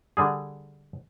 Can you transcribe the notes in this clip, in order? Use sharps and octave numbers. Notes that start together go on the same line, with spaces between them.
D3 G3 G#4